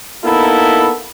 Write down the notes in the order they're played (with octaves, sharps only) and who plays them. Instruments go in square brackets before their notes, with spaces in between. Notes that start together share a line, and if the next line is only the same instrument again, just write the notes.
[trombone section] A#3 B3 D#4 E4 A4